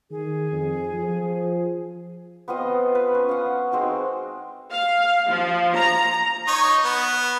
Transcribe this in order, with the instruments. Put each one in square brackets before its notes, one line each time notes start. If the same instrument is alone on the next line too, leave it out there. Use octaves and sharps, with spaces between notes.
[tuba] D#3 [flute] G#4
[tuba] F2
F3
[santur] B3 C4 F4 D#5
B4
C#4
F5 F#5
G#3 C4 D#4 F#4
[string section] F5
F3
A#5
[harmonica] D#4 C#5 D#5
B3